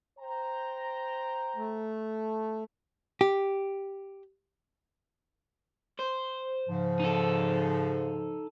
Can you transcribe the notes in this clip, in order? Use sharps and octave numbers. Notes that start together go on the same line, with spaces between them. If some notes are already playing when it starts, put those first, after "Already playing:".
C5 G5 A#5
A3
G4
C5
G#2 C#3 F3
D#4 A4